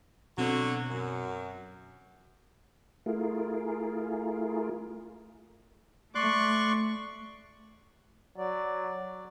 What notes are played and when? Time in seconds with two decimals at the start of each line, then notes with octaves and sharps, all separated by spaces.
0.38 B2 D3 F#3 C4 F#4
0.90 F#2
3.06 A3 E4 F4 G#4 A#4
6.15 A3 D5 C6 C#6 F#6
8.38 F#3 D5